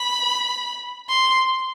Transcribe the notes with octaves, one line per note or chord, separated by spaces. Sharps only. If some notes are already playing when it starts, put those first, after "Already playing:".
Already playing: B5
C6